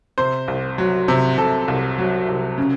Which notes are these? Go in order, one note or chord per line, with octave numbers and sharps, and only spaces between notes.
C3 C5
C2
F#3
C3
C3 A4
C2
F#3
C2
C#3